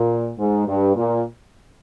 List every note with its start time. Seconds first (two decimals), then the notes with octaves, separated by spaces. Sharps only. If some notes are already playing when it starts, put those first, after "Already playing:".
Already playing: A#2
0.39 G#2
0.67 G2
0.96 A#2